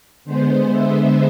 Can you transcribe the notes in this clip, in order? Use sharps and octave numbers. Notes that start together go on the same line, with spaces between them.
D3 G#3 B3 C5
E5